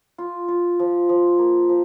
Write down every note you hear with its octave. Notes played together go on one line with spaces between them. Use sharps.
F4
F4
F3
F3
A#3
F3